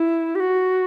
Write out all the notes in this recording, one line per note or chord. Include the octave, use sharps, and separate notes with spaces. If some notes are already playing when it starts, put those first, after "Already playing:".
Already playing: E4
G4
F#4